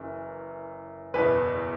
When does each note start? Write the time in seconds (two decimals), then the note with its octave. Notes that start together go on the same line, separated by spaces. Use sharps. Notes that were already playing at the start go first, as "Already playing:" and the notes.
Already playing: F#1 F#2 E3
1.14 F#1 E2 B2 B4